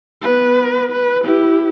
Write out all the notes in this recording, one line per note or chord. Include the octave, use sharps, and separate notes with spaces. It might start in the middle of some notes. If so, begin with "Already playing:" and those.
B3 B4
B4
E4 G4